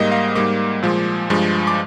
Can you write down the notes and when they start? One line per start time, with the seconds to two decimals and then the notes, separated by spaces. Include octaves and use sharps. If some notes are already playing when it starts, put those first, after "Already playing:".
Already playing: G#2 G3 A#3 D#5
0.12 F5
0.35 G#2 G3 A#3 D6
0.83 A#2 F3 G#3
1.30 G2 F3 G#3
1.67 D6